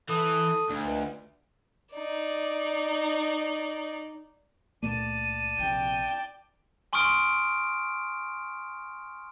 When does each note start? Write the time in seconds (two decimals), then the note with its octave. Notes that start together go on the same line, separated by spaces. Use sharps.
0.09 E3 A4 D#6
0.70 D2
0.84 C#2
1.95 D#4 D5
4.83 C#2 A#2 A3 D5 A5 D#7
5.59 A#1 C3 G5
6.93 G#5 C6 C#6 D#6 F6 D7